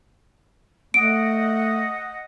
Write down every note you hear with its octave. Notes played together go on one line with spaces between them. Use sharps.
A3 D#5 F#5 D7